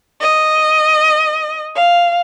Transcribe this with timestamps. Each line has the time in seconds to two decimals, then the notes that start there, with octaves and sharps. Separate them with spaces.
0.21 D#5
1.75 F5